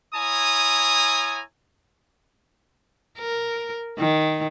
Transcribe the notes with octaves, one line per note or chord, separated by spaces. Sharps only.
E4 C#5 G#5 A#5 D#6
A#4
D#3